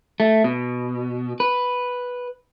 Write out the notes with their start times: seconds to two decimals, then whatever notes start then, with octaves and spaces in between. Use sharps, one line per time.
0.20 A3
0.44 B2
1.40 B4